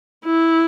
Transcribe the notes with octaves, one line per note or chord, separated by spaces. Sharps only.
E4